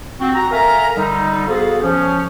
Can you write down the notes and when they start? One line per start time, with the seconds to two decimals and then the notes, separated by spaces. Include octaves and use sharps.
0.20 C4 F#4
0.35 F#4 A#5
0.51 A4 A#4 E5 F5 G#5 A#5
0.96 D3 G3 D#4
1.48 B3 F#4 G#4 A4 C5 F5
1.82 F3 C#4